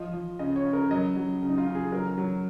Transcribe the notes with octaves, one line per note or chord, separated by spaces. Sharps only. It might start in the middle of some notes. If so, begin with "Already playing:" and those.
Already playing: F3 D#5
F3
C#3 D#5
C#5
C#3
A#4
F#3 D#5
F#3
C#3
D#4
F4
C#3
G#4
F#3 A#4
F#3